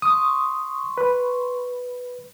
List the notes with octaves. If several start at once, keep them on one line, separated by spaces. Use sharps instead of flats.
C6 C#6 D#6
B4